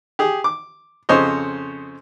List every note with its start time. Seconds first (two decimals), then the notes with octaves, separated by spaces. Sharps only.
0.19 G4 G#4
0.44 D6
1.09 F2 C#3 C5 C#5 D#5